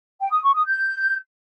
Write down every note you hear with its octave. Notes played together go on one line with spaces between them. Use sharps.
G5
D#6
C#6
D#6
G6